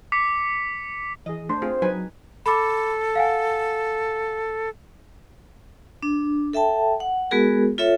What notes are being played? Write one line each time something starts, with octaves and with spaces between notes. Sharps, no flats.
D6 B6 C#7
E3 G#4 D#5
A3 D4 C5
C4 F4 G#4
F#3 D#4 B4 G#5
A4 B5 D6
F5 F#5 G#5
D4
A4 E5 G5 A5
F#5
G#3 B3 F#4 G#4 A#4
F4 A4 C#5 E5